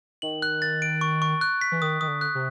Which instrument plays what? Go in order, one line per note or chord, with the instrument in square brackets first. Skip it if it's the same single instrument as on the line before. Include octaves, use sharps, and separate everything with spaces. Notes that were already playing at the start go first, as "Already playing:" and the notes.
[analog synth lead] D#3 [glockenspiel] F#7
[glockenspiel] F#6
A6
D7
C#6
C#6
F#6
B6
[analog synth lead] E3
[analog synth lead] D#3 [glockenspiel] D#6
[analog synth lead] D#3 [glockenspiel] D#6
[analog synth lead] D3
[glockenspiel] F#6
[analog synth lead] C3